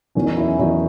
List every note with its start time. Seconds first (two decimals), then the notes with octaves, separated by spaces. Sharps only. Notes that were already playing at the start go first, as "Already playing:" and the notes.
0.15 E2 D#3 F#3 C#4
0.26 D#4
0.37 E4
0.48 C#4
0.59 E2 D#3 F#3 D#4